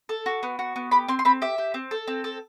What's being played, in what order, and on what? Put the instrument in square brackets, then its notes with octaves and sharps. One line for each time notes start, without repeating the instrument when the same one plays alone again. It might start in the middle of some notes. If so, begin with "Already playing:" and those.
[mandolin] A4
F#4
B3
F#4
B3
G4 B5
C4 C6
C6
C4 B5
G4 E5
G4
C4
A4
C4
A4